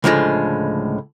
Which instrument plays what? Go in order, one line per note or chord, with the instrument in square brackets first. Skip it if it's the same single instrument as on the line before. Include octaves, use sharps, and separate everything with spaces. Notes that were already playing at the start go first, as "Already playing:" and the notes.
[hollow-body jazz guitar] C#2 A2 D3 F3 G3 G#3